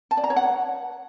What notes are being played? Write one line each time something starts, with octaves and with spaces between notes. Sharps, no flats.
A5
D5
A#5
C#5
F#5